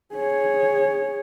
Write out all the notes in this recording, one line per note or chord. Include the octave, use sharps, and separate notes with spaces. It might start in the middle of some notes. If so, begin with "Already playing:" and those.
G#4 C#5